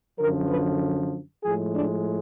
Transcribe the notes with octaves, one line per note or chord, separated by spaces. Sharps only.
F#2 D3 F3 A#4
B4
A2 F3 G#3 G#4
D4